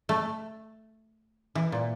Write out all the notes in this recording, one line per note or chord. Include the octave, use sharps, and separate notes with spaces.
A3
E3
A#2